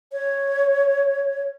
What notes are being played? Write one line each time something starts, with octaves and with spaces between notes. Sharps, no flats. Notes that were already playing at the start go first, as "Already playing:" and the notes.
C#5